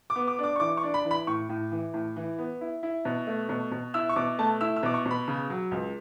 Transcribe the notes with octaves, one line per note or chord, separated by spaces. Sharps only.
D6
B3
D6
D4 D6
C#6
E3 D6
C#6
D4
B5
E3
B5
A2 C#6
A2
E3
A2
E3
B3
E4
E4
B2
A3
B2
B2
E4 E6
C#6
B2 D6
A3 A5
E4 E6
E6
B2 D6
C#6
B2
B5
C#3
F#3
C#2